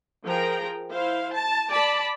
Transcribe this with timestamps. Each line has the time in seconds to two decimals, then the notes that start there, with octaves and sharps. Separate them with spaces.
0.24 F3 G#4 A#4 G5 A#5
0.90 E4 C5 F5
1.33 A5
1.70 D5 A5 B5